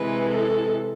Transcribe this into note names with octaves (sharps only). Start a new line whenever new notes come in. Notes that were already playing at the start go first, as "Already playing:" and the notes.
Already playing: C3 E3 G#3 B4
A4